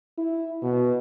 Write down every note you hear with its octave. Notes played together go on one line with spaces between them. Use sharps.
E4
B2